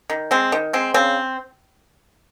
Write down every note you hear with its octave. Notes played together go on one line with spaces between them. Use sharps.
D#3
G#3 C4
D#3
G#3 C4
C#3 C4